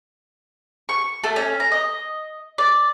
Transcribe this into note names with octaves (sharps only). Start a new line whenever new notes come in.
C#6
A3
C#4
A#5
D#5
D5